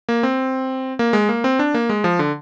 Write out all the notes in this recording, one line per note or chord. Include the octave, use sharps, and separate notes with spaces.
A#3
C4
A#3
G#3
A#3
C4
D4
A#3
G#3
F3
D3